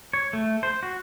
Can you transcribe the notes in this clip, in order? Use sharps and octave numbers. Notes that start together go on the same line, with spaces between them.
C#5
A3
C5
F#4